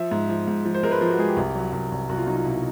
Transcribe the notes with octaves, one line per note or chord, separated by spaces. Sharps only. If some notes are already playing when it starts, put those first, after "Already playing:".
Already playing: F3 E5
G#2
F3
G#2
F3
C5
G#3 A#4
B4
F3
F#4
G#3 G#4
G4
C2
F#3
C2
C2
C2 F#4
F4
F#3 D#4
F4
B2 E4
D#4